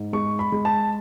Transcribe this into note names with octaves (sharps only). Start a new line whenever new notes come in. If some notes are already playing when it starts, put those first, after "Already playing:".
Already playing: G#2
G#3 C#6
B5
G#3
A5